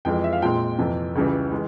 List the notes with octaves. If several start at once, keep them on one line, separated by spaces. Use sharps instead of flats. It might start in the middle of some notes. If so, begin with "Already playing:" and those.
F2 E3 G#3 G5
E5
F5
A#2 G#3 C4 G5
F2 C3 E3
C#2 C#3 E3 G3
E3 G#3